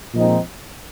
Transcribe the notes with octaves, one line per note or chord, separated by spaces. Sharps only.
A#2 F3 G#3 C4 D#4